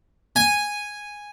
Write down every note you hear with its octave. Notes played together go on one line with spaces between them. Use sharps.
G#5